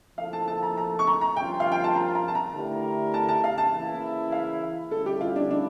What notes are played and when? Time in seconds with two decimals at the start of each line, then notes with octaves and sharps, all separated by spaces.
0.18 F3 A#3 E4 A4 F5
0.33 A5
0.47 A5
0.63 A#5
0.77 A#5
0.99 C#6
1.07 A#5
1.21 A#5
1.36 G2 F3 C#4 F4 A#4 G5
1.60 F5
1.72 G5
1.84 A5
1.96 A#5
2.15 A#5
2.28 A5
2.35 A#5
2.55 D3 A3 E4 G4 A#4
3.14 A5
3.28 A5
3.44 F5
3.58 A5
3.73 C#3 E3 A#3 E4
4.32 F5
4.91 D3 G3 C#4 E4 A4
5.06 G4
5.21 F4
5.36 D4
5.50 D4